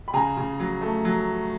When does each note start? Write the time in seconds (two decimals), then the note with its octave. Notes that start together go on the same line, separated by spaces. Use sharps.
0.08 B5
0.14 C#3 G#5 A#5
0.37 C#3
0.60 F#3
0.81 A3
1.05 F#3